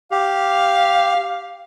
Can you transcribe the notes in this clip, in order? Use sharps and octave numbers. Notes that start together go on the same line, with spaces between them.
G4 F5